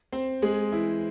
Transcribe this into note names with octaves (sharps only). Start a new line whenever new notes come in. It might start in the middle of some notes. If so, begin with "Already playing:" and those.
C4 C5
G#3 G#4
E3 E4